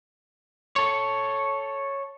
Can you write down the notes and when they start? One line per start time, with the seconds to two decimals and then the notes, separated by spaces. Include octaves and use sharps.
0.76 A4 C#5